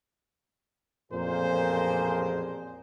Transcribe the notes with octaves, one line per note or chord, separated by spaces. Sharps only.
A1 F2 A#2 G#4 A#4 C5